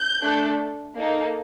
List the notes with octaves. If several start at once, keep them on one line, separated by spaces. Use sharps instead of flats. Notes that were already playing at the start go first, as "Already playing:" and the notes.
Already playing: G6
A3 D4 A4
A#3 D#4 A4